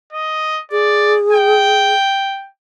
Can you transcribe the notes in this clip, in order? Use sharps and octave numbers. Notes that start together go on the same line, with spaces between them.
D#5
G#4 D5
G5